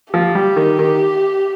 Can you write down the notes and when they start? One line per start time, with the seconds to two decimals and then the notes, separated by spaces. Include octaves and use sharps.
0.14 F3 G4
0.35 G3
0.56 D#3
0.79 D#3